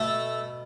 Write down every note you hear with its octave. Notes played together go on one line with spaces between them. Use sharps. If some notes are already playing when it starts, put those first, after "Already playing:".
Already playing: B2 A3